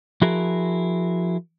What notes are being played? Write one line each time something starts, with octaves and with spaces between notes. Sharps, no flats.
F3 E4 F#4 G#4 A#4